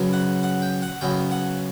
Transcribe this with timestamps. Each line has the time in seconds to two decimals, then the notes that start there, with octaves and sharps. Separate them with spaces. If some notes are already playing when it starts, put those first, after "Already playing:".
Already playing: C#3 F#3 B3
0.13 F#5
0.43 F#5
0.62 G5
0.82 F#5
1.01 C#3 F#3 B3 G5
1.31 F#5